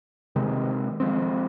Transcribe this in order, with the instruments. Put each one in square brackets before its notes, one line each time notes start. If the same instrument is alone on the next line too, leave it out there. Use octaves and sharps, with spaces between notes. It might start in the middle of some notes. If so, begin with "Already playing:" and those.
[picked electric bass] C3 D#3 G#3 C4
F3 G#3 C4